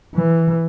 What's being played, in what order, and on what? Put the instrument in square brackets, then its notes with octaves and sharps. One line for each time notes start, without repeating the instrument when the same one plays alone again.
[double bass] E3